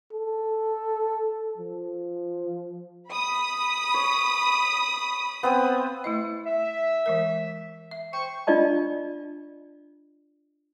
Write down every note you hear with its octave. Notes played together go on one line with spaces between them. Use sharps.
A4
F3
B5 D#6
C#5
B3 C4
A3 E4 D#5
E5
E3 G#3 A#4
E5
C5 G5 C#6
D4 F4 D5 D#5 A5